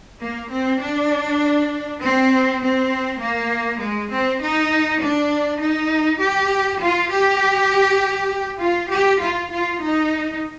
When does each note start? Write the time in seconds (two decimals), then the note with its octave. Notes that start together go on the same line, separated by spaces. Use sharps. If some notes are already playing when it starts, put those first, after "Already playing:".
0.21 A#3
0.51 C4
0.81 D4
2.02 C4
2.62 C4
3.21 A#3
3.82 G#3
4.11 C4
4.42 D#4
5.02 D4
5.60 D#4
6.20 G4
6.82 F4
7.10 G4
8.61 F4
8.91 G4
9.21 F4
9.50 F4
9.81 D#4